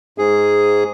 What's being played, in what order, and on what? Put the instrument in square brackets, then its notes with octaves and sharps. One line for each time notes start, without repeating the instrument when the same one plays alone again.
[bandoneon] G#2 G#4